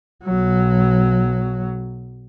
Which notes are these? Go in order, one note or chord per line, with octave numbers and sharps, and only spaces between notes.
B1 F#3